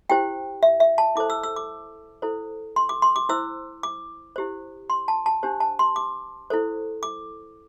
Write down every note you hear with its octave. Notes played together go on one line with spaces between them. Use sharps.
E4 G4 C5 G5
E5
E5
A5
E4 A4 C5 D6
E6
E6
D6
E4 A4 C5
C6
D6
C6
D6
E4 C5 E6
D6
E4 G4 C5
C6
A5
A5
D4 G4 C5
A5
C6
D6
E4 A4 C5
D6